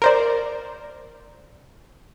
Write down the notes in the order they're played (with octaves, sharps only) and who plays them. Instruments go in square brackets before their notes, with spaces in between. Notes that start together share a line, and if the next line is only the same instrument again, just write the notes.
[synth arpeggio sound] A#4 C5 D5